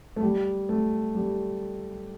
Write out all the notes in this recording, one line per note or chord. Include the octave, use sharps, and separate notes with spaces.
A3
G3
A3
G3